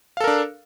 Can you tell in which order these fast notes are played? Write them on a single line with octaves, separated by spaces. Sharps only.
F5 A4 A#4 D4